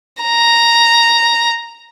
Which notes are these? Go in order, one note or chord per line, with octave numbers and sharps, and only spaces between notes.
A#5